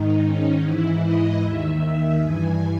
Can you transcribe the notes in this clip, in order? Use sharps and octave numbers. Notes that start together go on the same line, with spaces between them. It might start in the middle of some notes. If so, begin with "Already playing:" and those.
Already playing: G#2 D#3 D#4
C#4
G#2 E3 E4
D#5
D#2 D#3 E5
G2 E3 G#5